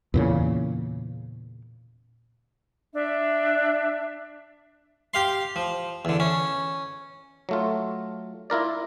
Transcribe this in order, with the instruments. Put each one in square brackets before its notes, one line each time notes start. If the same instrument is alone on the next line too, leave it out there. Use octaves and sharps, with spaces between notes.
[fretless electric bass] E2 A#2 C#3
[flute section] D4 E5
[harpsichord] G4 F5 C6
F3
E2 D3
C#4
[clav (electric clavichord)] F#3 A3 F4
E4 F4 A#4 D5